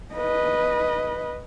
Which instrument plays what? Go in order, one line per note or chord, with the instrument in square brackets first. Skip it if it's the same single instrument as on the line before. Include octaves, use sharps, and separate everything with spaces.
[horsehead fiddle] B4 D#5